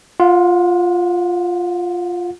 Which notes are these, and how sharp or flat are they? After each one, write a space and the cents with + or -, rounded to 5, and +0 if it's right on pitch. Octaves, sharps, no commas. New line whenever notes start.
F4 +0 F#5 -35